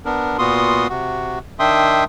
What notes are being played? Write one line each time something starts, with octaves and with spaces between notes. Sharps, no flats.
B3 D4 A#4
A#2 B3 F4 F#4 C6 D#6
C3 F#4
D#3 D4 E5 G5 C6 D#6